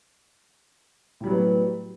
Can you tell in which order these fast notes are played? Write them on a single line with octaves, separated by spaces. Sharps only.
A2 G3 F#3 B3